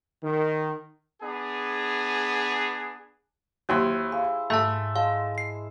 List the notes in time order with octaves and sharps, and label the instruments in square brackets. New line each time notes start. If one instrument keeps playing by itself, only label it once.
[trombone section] D#3
[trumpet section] B3 D4 G#4
[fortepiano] D#2 F#3 [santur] E4 C5
[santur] G#4 [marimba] F5
[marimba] G#2 [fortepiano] A3 [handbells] E5 A5
[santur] G#3 A5 [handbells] F5
[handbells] C7